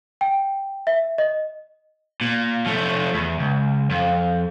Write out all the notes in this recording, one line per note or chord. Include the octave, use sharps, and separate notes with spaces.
G5
E5
D#5
A#2
F3 A3
E2
C#2
F2